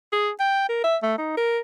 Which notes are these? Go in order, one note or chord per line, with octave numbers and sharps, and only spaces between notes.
G#4
G5
A#4
E5
A3
D#4
A#4